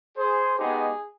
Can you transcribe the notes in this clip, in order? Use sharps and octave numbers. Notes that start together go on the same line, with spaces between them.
G#4 C5
G#3 B3 D#4 G4 G#4